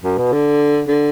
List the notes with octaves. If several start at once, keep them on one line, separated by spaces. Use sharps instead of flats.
F#2
B2
D3
D3